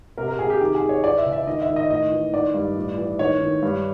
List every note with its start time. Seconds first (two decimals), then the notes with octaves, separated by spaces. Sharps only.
0.17 C3 A#4
0.28 A#4
0.39 C3 G#4
0.50 G4
0.61 D#3 G4
0.75 G#4
0.82 D#3
0.89 C#5
1.04 E3 D5
1.18 E5
1.26 C#3
1.32 E5
1.47 D#3 D#5
1.62 E5
1.69 D#3
1.76 D#5
1.90 A2 D#5
2.11 E3
2.33 D#3 D5
2.54 G2
2.77 A2
2.98 E3
3.19 D#3 C#5
3.41 D#3
3.62 G2